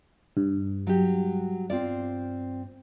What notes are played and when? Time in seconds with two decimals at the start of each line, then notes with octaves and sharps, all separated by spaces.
0.37 G2
0.87 F#3 G4
1.70 C4 F4 D5